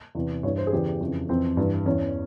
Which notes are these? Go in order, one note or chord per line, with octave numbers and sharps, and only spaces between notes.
E2 C3 E3
G2 E3 C#5
C5
G#4
E2 C#3 E3 G4
F2 C#3 E3
F2 E3 C4
G2 E3
E2 E3 C#4